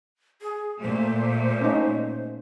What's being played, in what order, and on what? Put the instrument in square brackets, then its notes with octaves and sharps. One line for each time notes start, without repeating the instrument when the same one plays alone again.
[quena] G#4
[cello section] A#2 A3 [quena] C5
[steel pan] C#4 D#4